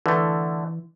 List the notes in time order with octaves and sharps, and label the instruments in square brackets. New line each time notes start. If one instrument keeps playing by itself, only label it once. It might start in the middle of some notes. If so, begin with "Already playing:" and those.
[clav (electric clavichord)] D3 A3 [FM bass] E3